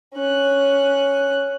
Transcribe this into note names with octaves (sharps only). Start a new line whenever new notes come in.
C#4 F#6